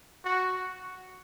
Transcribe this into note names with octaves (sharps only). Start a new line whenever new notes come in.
F#4